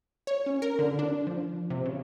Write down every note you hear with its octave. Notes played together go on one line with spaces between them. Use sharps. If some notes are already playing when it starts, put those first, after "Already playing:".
C#5
C#4
A#4
D3
D4
F3
C3
C#3